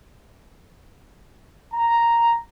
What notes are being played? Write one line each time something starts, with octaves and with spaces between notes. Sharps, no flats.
A#5